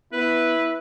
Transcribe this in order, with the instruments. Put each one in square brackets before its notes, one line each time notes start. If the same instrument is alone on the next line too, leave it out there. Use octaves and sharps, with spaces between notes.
[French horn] B3 [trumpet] E4 [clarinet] B4